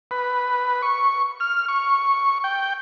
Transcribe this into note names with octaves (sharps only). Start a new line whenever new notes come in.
B4
C#6
F6
C#6
G5